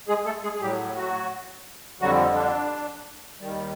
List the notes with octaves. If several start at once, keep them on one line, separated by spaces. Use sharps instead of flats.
G#3 G#4
A3 A4
G#3 G#4
G#4
A2 F#3 G3 G4
F#3 F#4
F2 D3 F#3 G3 F#4
D4
D#2 D#3 G3